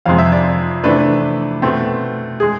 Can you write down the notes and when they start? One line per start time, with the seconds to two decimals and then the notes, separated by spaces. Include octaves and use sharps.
0.05 F2 C3 G#3 C4 F5
0.18 E5
0.32 D5
0.84 C3 E3 A3 D4 B4
1.62 B2 A3 C4
2.40 G#3 G#4